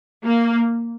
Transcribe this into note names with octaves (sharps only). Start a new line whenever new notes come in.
A#3